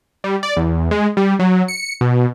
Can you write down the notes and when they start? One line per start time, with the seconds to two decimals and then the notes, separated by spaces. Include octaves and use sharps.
0.24 G3
0.43 D5
0.56 E2
0.91 G#3
1.17 G3
1.39 F#3
1.68 C#7
2.01 B2